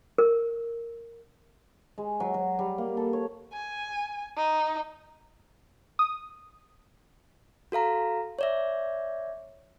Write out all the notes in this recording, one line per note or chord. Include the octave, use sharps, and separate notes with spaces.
A#4
G#3
F#3
F#3
G3
A#3
A4
C#5
G#5
D#4
D#6
F#4 A4 F5 A#5
C#5 D5 E5